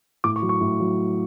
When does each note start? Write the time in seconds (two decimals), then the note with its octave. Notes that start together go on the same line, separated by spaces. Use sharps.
0.24 A2 D6
0.36 C#6
0.42 F#3
0.49 C#6
0.61 A2
0.80 F#3